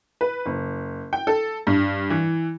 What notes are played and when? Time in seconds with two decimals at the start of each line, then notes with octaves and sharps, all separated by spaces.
0.21 B4
0.46 F#1
1.13 G5
1.27 A4
1.67 G2
2.10 E3